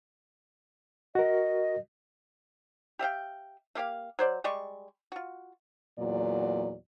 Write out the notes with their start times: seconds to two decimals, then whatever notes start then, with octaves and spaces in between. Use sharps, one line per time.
1.15 F#4 A#4 D#5
2.99 G4 E5 F5 G5
3.75 A3 A#3 G4 F5
4.19 F#3 C5 D5
4.44 G3 G#3 D5 C#6
5.12 F4 F#4
5.99 E2 A#2 F#3 D5